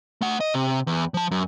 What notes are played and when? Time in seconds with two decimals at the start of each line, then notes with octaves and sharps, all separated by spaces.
0.21 A3 F#5
0.41 D#5
0.54 C3
0.87 E2
1.14 F3 A5
1.31 F#2